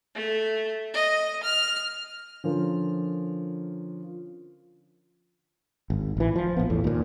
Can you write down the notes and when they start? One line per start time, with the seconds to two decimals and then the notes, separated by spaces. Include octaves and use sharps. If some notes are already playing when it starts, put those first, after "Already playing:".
0.15 A3
0.94 D#5
1.43 F6
2.44 D3 F3 C#4 A#4
5.90 G#1
6.17 A1 E3
6.36 F3
6.57 A#1 B3
6.70 E2 A2
6.84 D#2 A#2